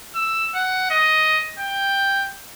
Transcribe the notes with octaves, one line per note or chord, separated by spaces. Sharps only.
E6
F#5
D#5
G5